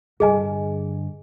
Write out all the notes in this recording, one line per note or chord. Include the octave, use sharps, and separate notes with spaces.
G2 D3 G#4 D#5 G#5